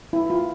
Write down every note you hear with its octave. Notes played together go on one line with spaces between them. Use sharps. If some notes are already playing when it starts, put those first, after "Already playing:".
E4
F4